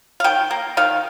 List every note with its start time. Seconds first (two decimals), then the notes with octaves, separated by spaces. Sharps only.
0.20 F5
0.24 D#3 G5
0.51 A#3
0.77 D#3 F5